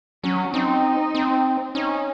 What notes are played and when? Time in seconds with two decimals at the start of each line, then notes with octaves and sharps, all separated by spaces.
0.24 F#3 C#4
0.54 C4 D#4
1.15 C4
1.75 C#4 D#4